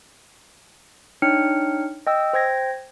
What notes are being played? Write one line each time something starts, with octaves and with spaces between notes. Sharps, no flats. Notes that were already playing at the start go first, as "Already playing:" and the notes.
D4 D#4 C#5 G5 F6 C#7
D#5 G5 E6
C5 G5 G#6 A#6